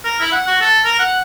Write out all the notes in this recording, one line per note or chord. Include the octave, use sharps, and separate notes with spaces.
A#4
E4
F#5
F#4
A4
A#4
F#5